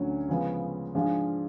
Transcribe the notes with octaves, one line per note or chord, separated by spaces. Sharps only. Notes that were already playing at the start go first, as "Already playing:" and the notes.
Already playing: D2 D3 F#3 C#4
C#3 F3 G#3 B3
G#2 F3 G#3 D4 F4